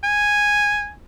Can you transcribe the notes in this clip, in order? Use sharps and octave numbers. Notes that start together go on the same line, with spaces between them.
G#5